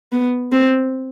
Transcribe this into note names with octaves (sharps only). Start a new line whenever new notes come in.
B3
C4